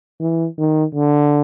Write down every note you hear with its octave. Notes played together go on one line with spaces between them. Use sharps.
E3
D#3
D3